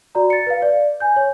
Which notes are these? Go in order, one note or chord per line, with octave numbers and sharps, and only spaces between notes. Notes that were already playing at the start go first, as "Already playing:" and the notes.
F#4 D5 A#5
A6 C#7
B4 F5
D5
G#5 G6
C#5